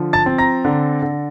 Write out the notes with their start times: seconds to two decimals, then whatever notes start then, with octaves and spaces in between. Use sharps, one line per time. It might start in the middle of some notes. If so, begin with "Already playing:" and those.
Already playing: D3 F3
0.13 A5 A6
0.26 C4
0.38 A#5 A#6
0.65 D3
1.02 D3